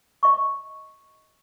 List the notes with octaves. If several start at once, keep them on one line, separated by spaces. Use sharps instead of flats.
D#5 C#6